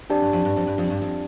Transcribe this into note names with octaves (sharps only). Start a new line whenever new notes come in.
F2 D4 G4 D5 A5
G2
F2
G2
F2
G2
F2
G2
F2